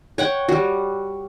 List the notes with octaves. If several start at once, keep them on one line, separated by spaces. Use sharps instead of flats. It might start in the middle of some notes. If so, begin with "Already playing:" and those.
C#5 F#5 G5
G3 F#4